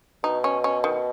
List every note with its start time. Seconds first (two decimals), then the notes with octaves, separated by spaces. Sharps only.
0.24 B2 D#4
0.44 C#4
0.64 C#4
0.84 D#3